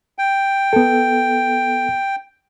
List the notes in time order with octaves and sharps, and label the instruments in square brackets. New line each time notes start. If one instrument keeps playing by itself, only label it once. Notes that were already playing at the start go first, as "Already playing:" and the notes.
[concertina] G5
[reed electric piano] B3 A4